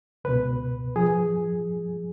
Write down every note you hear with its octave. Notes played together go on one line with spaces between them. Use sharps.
C#2 B2 B4
F3 G#4